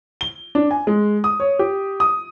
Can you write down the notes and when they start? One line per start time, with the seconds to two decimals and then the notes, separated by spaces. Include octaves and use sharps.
0.21 G7
0.55 D4
0.71 G#5
0.87 G#3
1.24 D#6
1.40 C#5
1.59 G4
2.00 D#6